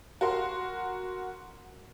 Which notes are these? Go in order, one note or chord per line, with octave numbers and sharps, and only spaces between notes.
F#4 A#4 C6